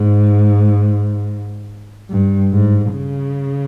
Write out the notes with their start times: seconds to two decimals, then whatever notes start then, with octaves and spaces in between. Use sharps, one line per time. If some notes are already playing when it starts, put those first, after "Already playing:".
Already playing: G#2
2.10 G2
2.52 G#2
2.93 C#3